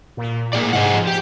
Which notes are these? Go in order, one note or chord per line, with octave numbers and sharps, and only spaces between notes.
A#2
A2 A#3 G#4 D5
G#2 C3 G#4 D#5 F#5
F3
G4 G5